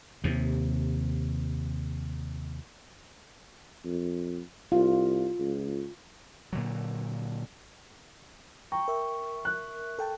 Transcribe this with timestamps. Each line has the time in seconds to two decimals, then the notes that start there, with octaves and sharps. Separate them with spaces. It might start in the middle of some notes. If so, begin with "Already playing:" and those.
0.24 D#2 C3
3.85 F2
4.72 C2 F4
5.39 C#2
6.53 A#2 D3 F#3
8.72 G5 A#5 C#6
8.88 A#4 E5
9.45 F#6
9.99 A4 G5 A5